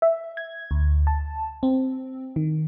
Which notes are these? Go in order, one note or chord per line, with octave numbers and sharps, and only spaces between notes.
E5
G#6
D2
A5
C4
D#3